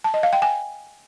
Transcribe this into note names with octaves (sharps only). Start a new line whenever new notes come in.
A5
D#5
F5
G5
G#5